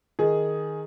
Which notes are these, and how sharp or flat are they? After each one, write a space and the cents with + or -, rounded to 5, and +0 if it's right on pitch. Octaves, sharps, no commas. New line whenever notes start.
D#3 +0 G#4 +0